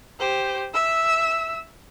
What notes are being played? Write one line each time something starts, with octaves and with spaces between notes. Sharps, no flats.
G4 C5
E5 E6